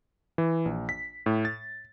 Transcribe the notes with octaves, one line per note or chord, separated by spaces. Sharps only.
E3
A#1
B6
A2
A6